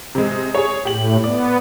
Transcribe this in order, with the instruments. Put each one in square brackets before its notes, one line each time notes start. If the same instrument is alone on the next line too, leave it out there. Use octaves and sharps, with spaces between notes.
[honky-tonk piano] C3 G#3
G#4 C#5
[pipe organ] A2 [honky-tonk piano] G4 F#7
[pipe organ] B3 [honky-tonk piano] D5